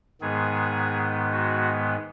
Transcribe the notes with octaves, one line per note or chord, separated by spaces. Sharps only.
G#2 D#3 G#3 B3 G#4
F#4